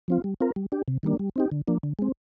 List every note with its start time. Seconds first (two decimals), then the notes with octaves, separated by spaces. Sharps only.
0.08 F3 C4 F4
0.24 G3
0.41 C4 F4 A#4
0.56 G3
0.72 D4 G4
0.88 C3
1.03 D#3 G3 A#3 D4
1.19 G3
1.36 C4 D#4 G4
1.52 D3
1.68 F3 A#3 D4
1.83 D3
1.99 G#3 C4